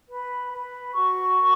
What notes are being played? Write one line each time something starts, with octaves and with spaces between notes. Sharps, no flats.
B4
B4
F#4 C#6
A#4